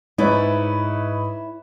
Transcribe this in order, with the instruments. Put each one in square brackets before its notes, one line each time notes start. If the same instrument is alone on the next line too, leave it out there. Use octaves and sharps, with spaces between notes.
[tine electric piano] G#2 [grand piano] D#4 B4 C#5 [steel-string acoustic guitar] E4 D5 E5